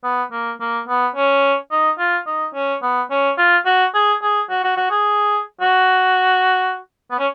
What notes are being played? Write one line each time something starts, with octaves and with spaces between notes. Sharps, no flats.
B3
A#3
A#3
B3
C#4
D#4
F4
D#4
C#4
B3
C#4
F4
F#4
G#4
G#4
F#4
F#4
F#4
G#4
F#4
B3
C#4